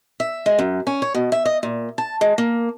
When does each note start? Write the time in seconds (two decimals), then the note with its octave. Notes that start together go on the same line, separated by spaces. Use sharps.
0.20 E5
0.46 G#3
0.59 F#2
0.87 C#4
1.02 C#5
1.14 B2
1.32 E5
1.45 D#5
1.63 A#2
1.98 A5
2.21 G#3
2.38 A#3